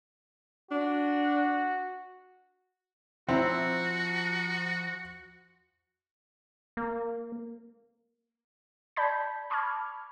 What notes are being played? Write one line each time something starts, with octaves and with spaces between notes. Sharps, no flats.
D4 F#4
F3 C4 E4 F#4 C5 A#5
A#3
D5 A5 B5 G6 G#6 B6
A5 B5 C#6 D6 F6 G#6